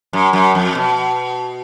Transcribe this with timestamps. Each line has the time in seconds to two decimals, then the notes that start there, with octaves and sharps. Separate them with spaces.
0.13 F#2
0.33 F#2
0.55 F2
0.75 B2